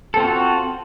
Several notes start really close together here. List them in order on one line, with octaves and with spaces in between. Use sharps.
A4 C4 F4 F#4